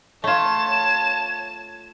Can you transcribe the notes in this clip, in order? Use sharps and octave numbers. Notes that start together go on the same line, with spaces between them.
A3 F4 C#5 A5 E7